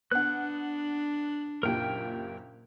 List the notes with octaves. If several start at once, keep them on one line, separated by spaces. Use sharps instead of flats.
B3 D4 F#5 F#6
F#1 A#2 G4 A#4 G5